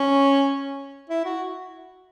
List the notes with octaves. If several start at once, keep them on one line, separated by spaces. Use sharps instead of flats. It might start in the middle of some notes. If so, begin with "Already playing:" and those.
Already playing: C#4
E4
F#4